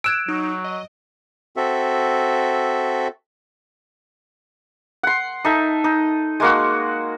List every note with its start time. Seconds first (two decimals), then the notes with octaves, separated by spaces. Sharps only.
0.04 E6 F#6 G#6 D7 E7
0.28 F#3 D#4
0.64 D#5
1.57 C4 F#4 A4 E5
5.03 F#5 C6
5.45 D#4 A4 E5
5.84 D#4
6.40 G#3 A#3 F#4